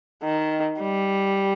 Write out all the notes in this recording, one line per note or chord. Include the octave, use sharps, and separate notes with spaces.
D#3
G3